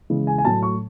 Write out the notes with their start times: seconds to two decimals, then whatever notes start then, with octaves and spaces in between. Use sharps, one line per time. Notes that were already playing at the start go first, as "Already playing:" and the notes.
0.10 C#3 E3 G#3
0.27 G#5
0.38 G#5
0.44 A2 F#3 A3 A5
0.62 C#6